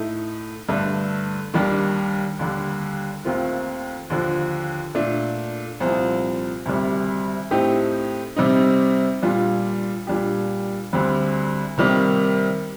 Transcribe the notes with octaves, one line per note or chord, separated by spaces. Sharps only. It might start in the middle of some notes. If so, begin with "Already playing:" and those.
Already playing: A2 A3 D#4
G2 D3 A3 D4
D#2 D#3 G3 D4
D#2 D3 G3
D#2 D#3 A3 C4 F4
D#2 D3 F3
A#2 A3 D4
C2 A#2 F3 C4
D2 C3 D#3 G3
A2 A3 C4 D#4 G4
C3 G3 C4 D#4
A#2 G3 D4 F4
A#2 G3 D4 G4
D2 D3 G3 C4
C3 D#3 G3 A#3